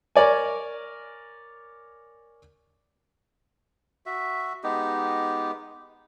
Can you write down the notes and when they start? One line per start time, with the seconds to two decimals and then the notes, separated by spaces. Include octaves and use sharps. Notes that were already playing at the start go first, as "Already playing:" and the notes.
0.16 A#4 C#5 D5 G#5
4.06 F#4 E5
4.64 G#3 B3 D#4 G4